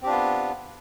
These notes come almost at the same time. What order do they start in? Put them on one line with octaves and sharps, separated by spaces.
C4 G4 D4 F4 B3